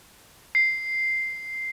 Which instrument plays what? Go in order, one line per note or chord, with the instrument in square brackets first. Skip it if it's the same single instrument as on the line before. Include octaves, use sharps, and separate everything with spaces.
[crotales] C7